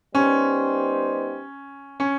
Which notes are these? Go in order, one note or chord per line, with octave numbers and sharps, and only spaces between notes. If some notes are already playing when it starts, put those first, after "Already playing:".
G3 B3 C#4 D#4 G4 C5
C#4